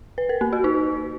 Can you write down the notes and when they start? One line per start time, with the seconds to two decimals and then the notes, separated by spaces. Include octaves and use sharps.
0.18 B4
0.29 A#4
0.41 A#3
0.53 F#4
0.64 D#4